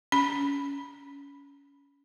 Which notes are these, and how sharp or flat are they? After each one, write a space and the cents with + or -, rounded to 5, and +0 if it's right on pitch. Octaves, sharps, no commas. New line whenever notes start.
C#4 +25 B5 -5